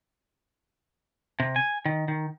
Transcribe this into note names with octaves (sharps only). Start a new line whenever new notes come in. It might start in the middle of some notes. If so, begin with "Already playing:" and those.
C3
G#5
D#3
D#3